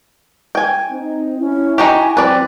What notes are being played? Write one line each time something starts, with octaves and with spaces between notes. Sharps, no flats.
G5 G#5
C4 D#4
C#4 E4
D#4 F#4 G4 G#5
D#2 F#3 C4 E4 B4 D5